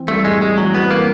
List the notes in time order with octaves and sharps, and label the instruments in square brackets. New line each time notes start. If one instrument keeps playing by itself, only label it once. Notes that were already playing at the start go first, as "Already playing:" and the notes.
Already playing: [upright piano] E3 C4
[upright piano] G3 [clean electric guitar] A3
[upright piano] A2 [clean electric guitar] G#3
[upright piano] G3 [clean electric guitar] G#3
[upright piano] E3 [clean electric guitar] F#3
[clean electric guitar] B3 [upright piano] C4
[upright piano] E3 [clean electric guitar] A#3